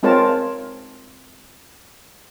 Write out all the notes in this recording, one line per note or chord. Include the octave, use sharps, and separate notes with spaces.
G#3 C4 F4 A#4 C#5 A5